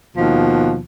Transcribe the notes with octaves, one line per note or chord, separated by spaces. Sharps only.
D#2 B2 F3